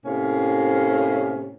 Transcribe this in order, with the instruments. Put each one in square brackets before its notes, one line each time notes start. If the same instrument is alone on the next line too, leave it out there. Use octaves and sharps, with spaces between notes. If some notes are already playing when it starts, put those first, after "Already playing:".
[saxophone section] A2 C3 A#3 C#4